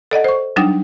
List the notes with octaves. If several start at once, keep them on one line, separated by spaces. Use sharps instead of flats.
A4 D5 D#5 F#5
C5 C#6
F#3 G3 D4 D#4